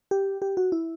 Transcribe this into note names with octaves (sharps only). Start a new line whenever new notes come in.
G4
G4
F#4
E4